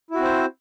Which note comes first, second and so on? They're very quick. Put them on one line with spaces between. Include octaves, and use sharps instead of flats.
E4 F#4 C4 C5